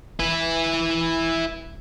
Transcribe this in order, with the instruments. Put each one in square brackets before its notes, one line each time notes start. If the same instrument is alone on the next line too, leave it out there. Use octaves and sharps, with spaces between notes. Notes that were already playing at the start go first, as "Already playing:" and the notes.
[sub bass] E1 [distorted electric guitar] E4 B4